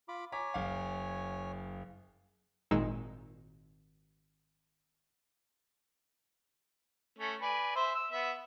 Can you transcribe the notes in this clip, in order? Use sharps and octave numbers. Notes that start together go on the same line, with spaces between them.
F4 B5 D6
C#5 G#5 A#5 D6 B6
F#1 F5
G#1 A#2 D#3 G#3 D#4 E6
A3 C#4 C#5
B4 D5 G#5
C5 E5 C6
E6
B3 E5